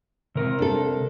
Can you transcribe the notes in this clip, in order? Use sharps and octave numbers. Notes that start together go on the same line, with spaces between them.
C3 A#4
D4 A4